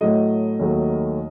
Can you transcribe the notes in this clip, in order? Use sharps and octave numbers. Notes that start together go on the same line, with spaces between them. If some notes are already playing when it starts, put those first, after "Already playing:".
A2 F#3 A3 D#5
D#2 D#3 F#3 A3